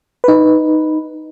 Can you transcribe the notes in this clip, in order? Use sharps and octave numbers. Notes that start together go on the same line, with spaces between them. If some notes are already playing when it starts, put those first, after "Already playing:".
D#4 B4